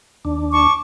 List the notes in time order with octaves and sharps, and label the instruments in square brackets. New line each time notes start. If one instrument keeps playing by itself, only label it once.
[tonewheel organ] D#2 D4
[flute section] A5 C#6 D6